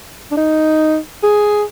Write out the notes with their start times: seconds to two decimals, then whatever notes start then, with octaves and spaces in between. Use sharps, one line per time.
0.31 D4
0.37 D#4
1.23 G#4